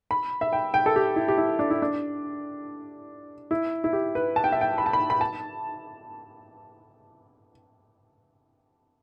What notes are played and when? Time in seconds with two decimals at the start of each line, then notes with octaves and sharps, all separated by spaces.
0.11 B5
0.41 E5
0.53 G5
0.74 G5
0.86 A4
0.96 G4
1.16 E4
1.28 G4
1.37 E4
1.59 D4
1.70 E4
1.82 D4
3.51 E4
3.84 E4
3.93 G4
4.15 B4
4.36 A5
4.44 G5
4.52 E5
4.61 G5
4.78 B5
4.86 A5
4.93 B5
5.10 B5
5.21 A5